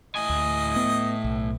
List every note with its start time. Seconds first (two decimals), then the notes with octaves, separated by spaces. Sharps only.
0.16 A2 D#5 G#5
0.30 D2
0.76 B3
1.24 B1